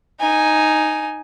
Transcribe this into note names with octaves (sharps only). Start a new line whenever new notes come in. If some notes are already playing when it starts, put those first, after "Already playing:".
D#4 G#5